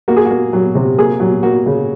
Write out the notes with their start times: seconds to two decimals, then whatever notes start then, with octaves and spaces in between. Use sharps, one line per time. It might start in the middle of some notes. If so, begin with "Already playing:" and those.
0.08 A#3 F#4
0.17 G#4
0.25 F#4
0.31 A#3
0.53 F#3
0.75 C3
0.98 A#3 G#4
1.20 F#3
1.43 A#3 F#4
1.66 C#3